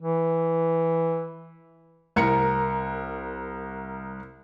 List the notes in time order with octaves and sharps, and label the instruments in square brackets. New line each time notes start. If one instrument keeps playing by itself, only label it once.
[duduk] E3
[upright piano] C2 A#4 C#7